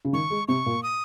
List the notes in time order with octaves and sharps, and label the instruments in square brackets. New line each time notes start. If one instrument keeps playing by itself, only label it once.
[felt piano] C#3
[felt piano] D#3 [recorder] C#6
[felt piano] G#3
[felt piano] C3 [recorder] C#6
[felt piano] A#2
[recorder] D#6